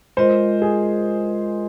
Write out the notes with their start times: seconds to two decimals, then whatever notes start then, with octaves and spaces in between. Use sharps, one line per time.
0.17 G#3 F4 A#4 C5 D#5
0.62 G#4